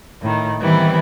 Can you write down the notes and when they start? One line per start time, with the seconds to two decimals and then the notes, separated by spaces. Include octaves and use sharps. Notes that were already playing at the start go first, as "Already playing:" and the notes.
0.23 A2 D#3
0.61 D#3 E3 G3 B3 C4 E4